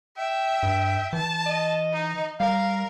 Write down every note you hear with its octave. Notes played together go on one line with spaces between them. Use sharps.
E5 G5
G2
E3 A5
D#5
D#4
G3 A#4 F5